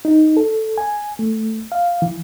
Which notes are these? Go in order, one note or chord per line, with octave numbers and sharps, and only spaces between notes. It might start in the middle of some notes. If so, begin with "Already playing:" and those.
D#4
A4
G#5
A3
F5
E3